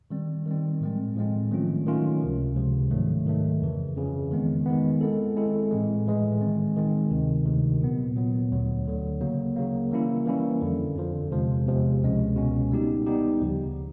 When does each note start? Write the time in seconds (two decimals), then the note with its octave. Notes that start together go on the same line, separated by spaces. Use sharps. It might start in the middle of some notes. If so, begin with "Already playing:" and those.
0.10 D#3 G3 C4
0.46 D#3 G3 C4
0.81 A2 F3 G#3 C4
1.15 A2 F3 G#3 C4
1.51 D#3 F#3 A3 C#4 F4
1.86 D#3 F#3 A3 C#4 F4
2.21 C#2 C3 F3
2.56 C#2 C3 F3
2.91 G#2 D#3 F#3 A3
3.25 G#2 D#3 F#3 A3
3.61 F2 C#3 E3
3.96 F2 C#3 E3
4.31 D#3 G#3 B3
4.66 D#3 G#3 B3
5.01 G#3 C4 E4 A4
5.36 G#3 C4 E4 A4
5.71 A2 E3 G#3
6.06 A2 E3 G#3
6.41 D#3 G#3 C4
6.76 D#3 G#3 C4
7.11 D2 C3 D#3
7.46 D2 C3 D#3
7.81 A#2 F#3 B3
8.16 A#2 F#3 B3
8.51 D2 D3 F#3
8.86 D2 D3 F#3
9.21 C#3 F#3 A#3
9.56 C#3 F#3 A#3
9.91 E3 G3 A#3 C#4 E4
10.26 E3 G3 A#3 C#4 E4
10.61 F2 D3 F3
10.96 F2 D3 F3
11.31 E2 C3 F3 G#3
11.66 E2 C3 F3 G#3
12.02 C#2 B2 G#3 C#4
12.36 C#2 B2 G#3 C#4
12.71 G3 B3 D#4 G4
13.06 G3 B3 D#4 G4
13.41 D2 C#3 F3